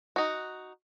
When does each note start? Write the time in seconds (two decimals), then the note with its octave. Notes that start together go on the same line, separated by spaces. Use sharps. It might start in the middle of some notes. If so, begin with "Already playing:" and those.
0.16 D#4 F#4